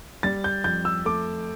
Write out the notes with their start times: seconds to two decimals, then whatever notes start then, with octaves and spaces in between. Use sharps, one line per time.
0.23 G3 A6
0.44 G6
0.64 F2 G6
0.85 E6
1.05 A3 D6